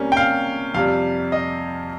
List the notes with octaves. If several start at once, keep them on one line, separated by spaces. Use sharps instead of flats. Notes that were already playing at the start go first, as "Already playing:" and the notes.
Already playing: C3 G3 A#3 C#4
G5
F5
F2 C3 G3 F5
D#5